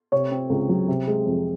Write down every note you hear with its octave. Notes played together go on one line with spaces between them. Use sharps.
C3 C#5
C4
C#2
F#3
C3
G#3
F2